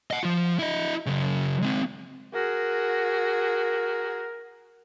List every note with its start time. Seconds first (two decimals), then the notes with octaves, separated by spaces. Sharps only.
0.11 D#5 F#5
0.24 F3 F4
0.59 E4 D#5
1.06 C#3 F#3
1.62 G#3 C4
2.35 F#4 G#4 A#4